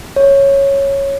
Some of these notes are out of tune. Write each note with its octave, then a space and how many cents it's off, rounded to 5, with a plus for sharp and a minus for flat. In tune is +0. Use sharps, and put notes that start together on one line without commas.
C#5 -5